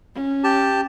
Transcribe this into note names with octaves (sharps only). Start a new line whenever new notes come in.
C#4
G4 A5